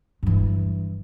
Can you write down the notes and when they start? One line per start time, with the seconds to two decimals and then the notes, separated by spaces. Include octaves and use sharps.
0.23 G2 E3